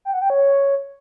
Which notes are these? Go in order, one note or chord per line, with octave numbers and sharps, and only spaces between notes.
G5
F#5
G5
C#5